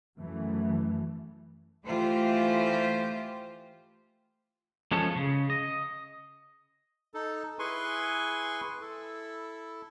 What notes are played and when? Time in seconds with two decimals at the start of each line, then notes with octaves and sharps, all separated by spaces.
0.18 F#2 E3 A3
1.86 E3 A3 F4 G4 C5
4.92 F3 G#3 C#4 A4
5.16 C#3
5.50 D#5
7.14 D#4 A4
7.59 E4 G#4 B4 G#5 C6 C#6
8.81 E4 A4